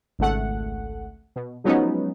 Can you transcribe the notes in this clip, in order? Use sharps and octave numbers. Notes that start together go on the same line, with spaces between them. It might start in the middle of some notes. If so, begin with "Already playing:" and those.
G#1 C#2 A3 F#5
B2
F3 F#3 G#3 B3 C#4 D#4